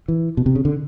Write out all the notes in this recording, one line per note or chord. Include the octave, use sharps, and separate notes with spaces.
E3
B2
C3
C#3
D3